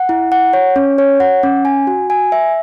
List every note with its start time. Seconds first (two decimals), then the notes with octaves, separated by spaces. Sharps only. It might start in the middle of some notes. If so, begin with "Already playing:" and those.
Already playing: F#5
0.09 E4
0.32 F#5
0.53 C#5
0.76 C#4
0.98 C#5
1.20 F#5
1.43 C#4
1.65 G#5
1.87 F#4
2.10 G#5
2.32 E5